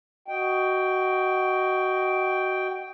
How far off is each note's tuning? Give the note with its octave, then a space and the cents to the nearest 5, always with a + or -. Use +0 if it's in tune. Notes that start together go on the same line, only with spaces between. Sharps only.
F#4 +15 D#5 +0 G5 +0